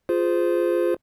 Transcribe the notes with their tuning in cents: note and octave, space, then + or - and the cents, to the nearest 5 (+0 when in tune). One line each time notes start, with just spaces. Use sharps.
F4 +0 G#4 +0 C5 -20